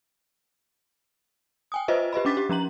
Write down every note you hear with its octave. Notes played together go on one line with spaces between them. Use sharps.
G5 G#5 D#6
F4 B4 C5 D#5 E5
G4 B4 D#5 B5
C#4 D4 D6 A6 B6
G4
F3 C#4 A#5 F#7